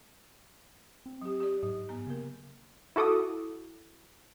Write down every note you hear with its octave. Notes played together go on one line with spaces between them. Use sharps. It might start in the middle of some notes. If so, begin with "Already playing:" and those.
C4
F#3 G4
G4 D5
G#2 F#3
B3 A#5
C#3 A#3 A#4
E4 F#4 A4 D6 D#6